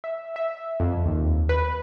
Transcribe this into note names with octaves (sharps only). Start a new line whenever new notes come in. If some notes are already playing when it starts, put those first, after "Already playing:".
E5
E5
F2
D#2
B4